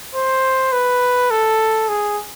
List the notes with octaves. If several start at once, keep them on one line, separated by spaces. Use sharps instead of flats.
C5
B4
A4
G#4